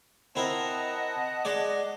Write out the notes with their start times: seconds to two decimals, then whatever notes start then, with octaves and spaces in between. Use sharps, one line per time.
0.35 C4 E4 A#4 D#5 F#5 A5
1.45 G#3 D5 D6